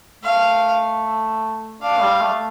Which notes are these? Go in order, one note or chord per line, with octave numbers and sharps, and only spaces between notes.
A3 F5
D4 F5
A3
G3
A3